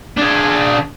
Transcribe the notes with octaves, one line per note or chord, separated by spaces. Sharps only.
D4 G#4